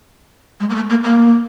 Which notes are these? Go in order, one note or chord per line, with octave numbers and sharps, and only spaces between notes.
G#3
A#3
A3
A#3
A#3